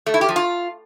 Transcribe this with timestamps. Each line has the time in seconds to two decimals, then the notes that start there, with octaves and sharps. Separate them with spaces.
0.07 A3
0.14 E4
0.21 G4
0.29 F3
0.36 F4